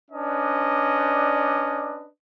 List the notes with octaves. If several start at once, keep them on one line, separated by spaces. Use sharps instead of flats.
C#4 D4 B4 D5 D#5